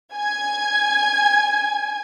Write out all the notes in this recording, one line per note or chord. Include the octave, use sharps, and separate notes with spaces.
G#5 G#6